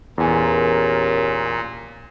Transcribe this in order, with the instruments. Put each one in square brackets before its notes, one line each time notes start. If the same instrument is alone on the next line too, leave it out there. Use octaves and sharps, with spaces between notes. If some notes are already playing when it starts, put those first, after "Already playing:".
[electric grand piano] E2 G#5 [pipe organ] A#2 [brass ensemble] C#4 G4 A#4